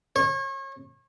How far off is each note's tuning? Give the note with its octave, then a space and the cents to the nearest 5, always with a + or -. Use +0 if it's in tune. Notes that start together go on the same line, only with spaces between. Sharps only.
C#5 -35